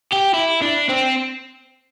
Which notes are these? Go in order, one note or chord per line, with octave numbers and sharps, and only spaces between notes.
G4
E4
D4
C4